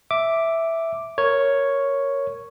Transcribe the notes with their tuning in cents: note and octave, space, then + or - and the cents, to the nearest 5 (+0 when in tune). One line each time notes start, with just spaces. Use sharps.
E5 +0 D6 +0
A#4 +0 C#5 +0